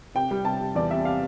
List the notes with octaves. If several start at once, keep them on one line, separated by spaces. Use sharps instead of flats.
C3 G5
G3
C3 A5
C3
E2 D5
C3 E5
C3 F5